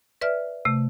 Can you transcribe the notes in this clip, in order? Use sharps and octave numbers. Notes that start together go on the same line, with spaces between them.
B4 D5 E5 F6
C3 A3